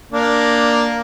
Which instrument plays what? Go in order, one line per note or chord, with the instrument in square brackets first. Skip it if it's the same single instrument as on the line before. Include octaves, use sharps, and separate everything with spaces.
[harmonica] A#3 D4